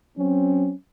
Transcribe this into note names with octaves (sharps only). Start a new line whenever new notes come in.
F#3 C4 C#4